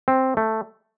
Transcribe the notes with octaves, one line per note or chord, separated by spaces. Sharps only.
C4
A3